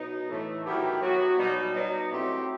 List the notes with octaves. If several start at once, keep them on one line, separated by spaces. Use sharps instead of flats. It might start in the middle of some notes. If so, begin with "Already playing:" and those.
Already playing: B2 F#3 B3 D#4
A2 E3 A3
D#3 F#3 B3 E4 G4
F#3 B3 F#4
B2 G3 D#4
B2 F#3 B3 D#4
F#3 A3 C4 E4 G4